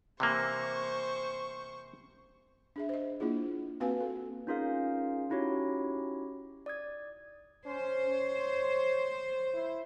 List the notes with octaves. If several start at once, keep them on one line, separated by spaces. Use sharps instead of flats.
C3 E3 A#3 C5 C#6
D4 G#4 E5
C5 D#5
A#3 D4 E4 F4 G#4
A#3 C4 F#4 B4 F5 G#5
A4
C#4 D#4 F4 G#4 A#4 F5
C#4 D#4 E4 F#4 G4 C#5
D5 D#6 G#6
C#4 C5
C#5
E4